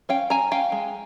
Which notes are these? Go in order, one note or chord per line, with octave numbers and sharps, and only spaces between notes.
C#4 F5 G5
C#4 G#5 A#5
C#4 F5 G5
G#3